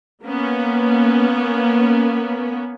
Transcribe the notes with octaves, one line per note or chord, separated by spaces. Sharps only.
A#3 B3 C#4